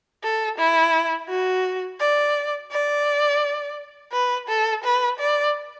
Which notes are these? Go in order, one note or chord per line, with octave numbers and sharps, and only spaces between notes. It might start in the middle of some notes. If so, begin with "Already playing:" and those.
A4
E4
F#4
D5
D5
B4
A4
B4
D5